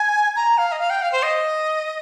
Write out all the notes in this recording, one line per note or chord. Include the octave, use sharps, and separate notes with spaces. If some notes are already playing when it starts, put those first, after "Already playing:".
Already playing: G#5
A#5
F5
D#5
F5
G5
F5
C5
D#5